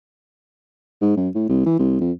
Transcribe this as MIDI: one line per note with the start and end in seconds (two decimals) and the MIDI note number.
1.02 1.16 44
1.17 1.29 42
1.35 1.47 45
1.49 1.65 36
1.66 1.79 52
1.79 1.99 36
2.01 2.12 41